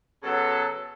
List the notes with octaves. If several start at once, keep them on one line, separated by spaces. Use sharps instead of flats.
C#3 F#3 B3 A4